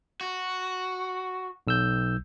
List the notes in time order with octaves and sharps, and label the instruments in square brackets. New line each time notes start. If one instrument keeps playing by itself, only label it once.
[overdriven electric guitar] F#4
[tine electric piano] B1 E6 G6